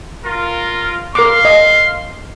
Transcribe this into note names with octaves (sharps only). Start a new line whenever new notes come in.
F4 A#4
A#4 F5 C6 D6
D#5